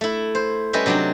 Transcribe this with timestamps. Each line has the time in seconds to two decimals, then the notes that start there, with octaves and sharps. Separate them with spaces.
0.01 A3 E4
0.35 C5
0.73 G3 C#4 B4 D#5 E5 G5
0.86 C3 F#3 D4 D#4 G5